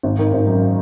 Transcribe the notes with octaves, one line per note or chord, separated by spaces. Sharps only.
G#1
D#3
G#1
F#2